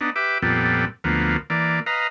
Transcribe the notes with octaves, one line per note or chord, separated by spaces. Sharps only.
B3 D4 D#4
G4 B4 E5 D6
F2 A#2 G3 B3 A4
D2 F3 A#3 B3
E3 A#3 D5
B4 D#5 F5 A#5